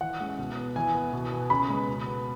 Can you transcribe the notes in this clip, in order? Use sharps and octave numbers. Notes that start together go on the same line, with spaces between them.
E3 F#5
G#3 C#4
B2
B3
E3 G#5
B3
B2
B3
C#3 B5
G#3 B3
B2
B3